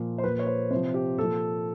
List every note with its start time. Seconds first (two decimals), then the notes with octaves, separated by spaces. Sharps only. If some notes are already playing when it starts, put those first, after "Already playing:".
Already playing: A#2 F3
0.18 C5
0.23 F3 B4
0.26 A#2
0.39 C#5
0.47 C5
0.70 C3 C5
0.75 F3
0.94 G4
1.18 A#2 F3 A4